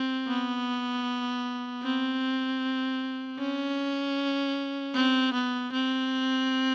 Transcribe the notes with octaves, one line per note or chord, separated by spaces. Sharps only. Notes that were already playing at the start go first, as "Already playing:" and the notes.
Already playing: C4
B3
C4
C#4
C4
B3
C4